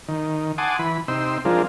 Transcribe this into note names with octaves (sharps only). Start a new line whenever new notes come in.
D#3
F#5 G#5 A5 C6 D6 D#6
E3 B5
C3 D#4 G5 C6 E6
F3 G#3 C4 D4 F4 A#4